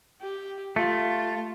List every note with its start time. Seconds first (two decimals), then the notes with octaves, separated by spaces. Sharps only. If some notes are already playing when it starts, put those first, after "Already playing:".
0.21 G4
0.76 A3 F4